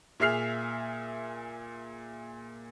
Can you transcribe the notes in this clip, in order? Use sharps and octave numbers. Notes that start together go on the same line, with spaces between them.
A#2 G#4 E5 F6 C7 F7